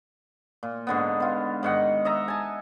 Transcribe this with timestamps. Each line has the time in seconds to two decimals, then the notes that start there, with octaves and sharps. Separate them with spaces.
0.63 A#2
0.87 G#2 D3 B3
1.20 B3 F4
1.63 G#2 D#3 F#5
2.05 D#5 E5 A#5
2.28 G#5 A5